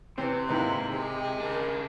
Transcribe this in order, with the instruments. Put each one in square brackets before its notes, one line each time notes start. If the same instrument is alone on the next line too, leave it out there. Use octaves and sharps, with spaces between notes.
[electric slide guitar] C3 [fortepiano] E3 C4 [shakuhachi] B4
[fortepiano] G#2 D#3 [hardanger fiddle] A#3 E4
[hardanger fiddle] G#3 [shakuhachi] G4
[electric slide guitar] C#3 D4 [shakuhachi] A#4